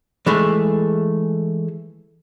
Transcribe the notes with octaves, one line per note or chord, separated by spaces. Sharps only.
E3 G#3 A3